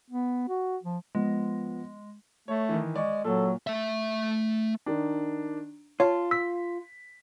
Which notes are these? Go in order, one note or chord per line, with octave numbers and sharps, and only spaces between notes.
B3
F#4
F3
F3 G#3 B3
A3 C#5
D#3 E3
G#3 D5 C#6
A#2 F#3 A4
A3 E5
D#3 D4
F4 C#5 A5
E6 B6